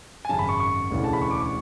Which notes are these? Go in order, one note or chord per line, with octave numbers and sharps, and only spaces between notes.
G#5
G#1 F#2 C#3 A5
B5
C#6
C#6
E1 D2 C#3 E3
A5
B5
C#6
D6
C#6